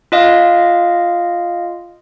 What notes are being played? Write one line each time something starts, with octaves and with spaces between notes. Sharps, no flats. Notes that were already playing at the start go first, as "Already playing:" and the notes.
F4 D#5 F5